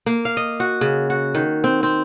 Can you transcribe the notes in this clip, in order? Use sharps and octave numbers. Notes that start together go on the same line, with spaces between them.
A#3
F5
D#5
F#4
C#3
F#4
D#3
C4
C4